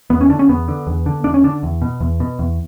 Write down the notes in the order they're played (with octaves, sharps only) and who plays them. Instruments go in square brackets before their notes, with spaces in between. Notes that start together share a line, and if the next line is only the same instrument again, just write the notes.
[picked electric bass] E2 B3
C#4
D3 D4
C#4
E2 B3
D3
E2
D3
E2 D4
C#4
D3 D4
E2
B2
E2
B2
E2